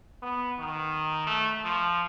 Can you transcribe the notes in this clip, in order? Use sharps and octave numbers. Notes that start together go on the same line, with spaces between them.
B3
D#3
A3
F3